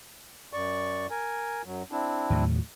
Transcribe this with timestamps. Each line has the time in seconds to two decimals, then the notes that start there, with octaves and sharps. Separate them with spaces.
0.53 F#2 D5 C#6
1.10 A#4 G#5
1.65 F#2 F#3
1.91 C4 D4 E4
2.30 D#2 A2 F#3